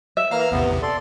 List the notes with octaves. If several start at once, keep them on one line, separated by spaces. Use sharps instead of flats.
E5
E3 A#3 F5 A#5 F6
A1 E2 C3 B3
A4 D5 C6